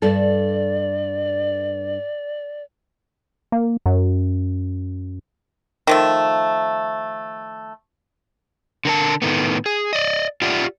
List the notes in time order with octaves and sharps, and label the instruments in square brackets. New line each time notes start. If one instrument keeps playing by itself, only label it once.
[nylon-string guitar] G2 A4 [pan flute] D5
[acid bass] A#3
F#2
[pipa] D#3 F3 A3
[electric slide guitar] D3 A#4 A5
A2 D#3 A3 B3
G#4
D5 D#5
F4 G4 D5 E5 F#5